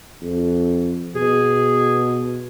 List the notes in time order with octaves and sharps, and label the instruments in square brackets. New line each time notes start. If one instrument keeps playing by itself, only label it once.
[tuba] F2
[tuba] B2 [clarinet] G#4